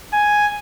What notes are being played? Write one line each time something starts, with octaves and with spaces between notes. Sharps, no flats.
G#5